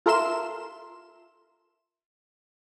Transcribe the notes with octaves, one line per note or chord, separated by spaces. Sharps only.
F4 A4 A#4 E5 C6 E7